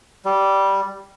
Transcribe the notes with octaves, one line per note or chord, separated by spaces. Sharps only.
G3